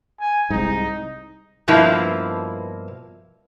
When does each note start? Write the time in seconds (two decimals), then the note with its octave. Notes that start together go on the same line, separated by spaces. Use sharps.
0.20 G#5
0.50 C2 G#2 D#4
1.68 G2 B2 F3 A#3 E4